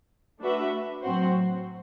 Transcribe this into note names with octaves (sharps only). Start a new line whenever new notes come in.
A3 D4 F#4 B4 E5
A2 F#3 C4 F#4 C5